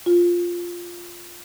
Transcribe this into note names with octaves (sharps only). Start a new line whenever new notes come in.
F4